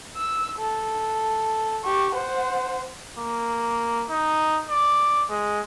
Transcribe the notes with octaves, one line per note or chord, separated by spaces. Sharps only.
E6
A4
G4 C#6
C5 F#5
A#3
D#4
D5
G#3